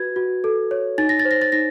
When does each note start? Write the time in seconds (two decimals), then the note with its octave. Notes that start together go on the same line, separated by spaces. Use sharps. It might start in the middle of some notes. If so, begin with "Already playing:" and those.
Already playing: F#4 B4 G#6
0.16 F#4
0.44 A4
0.71 C#5
0.98 D#4 A6
1.09 A#6
1.19 A6
1.25 C5
1.31 A#6
1.42 A6
1.52 D#4 A#6